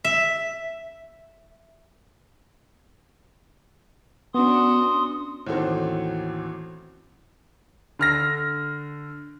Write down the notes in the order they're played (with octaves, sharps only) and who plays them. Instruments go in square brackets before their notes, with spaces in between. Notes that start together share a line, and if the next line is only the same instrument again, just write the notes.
[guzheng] E5
[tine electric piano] B3 [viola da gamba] C#4 D4 F#4 [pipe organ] C6 D#6
[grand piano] A1 D#2 C4 F#4 A4 C5
D3 F6 A#6